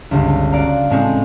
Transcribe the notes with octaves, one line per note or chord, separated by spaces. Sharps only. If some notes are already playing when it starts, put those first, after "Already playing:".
G1 C#2
F#4 D5 F5 A#5
A2 G#3 C4 C#4